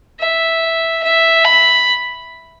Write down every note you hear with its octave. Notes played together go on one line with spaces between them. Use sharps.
E5
E5
B5